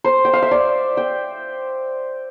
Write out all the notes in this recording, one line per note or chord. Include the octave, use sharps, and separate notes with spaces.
C5
G5
F5
E5
D5
G5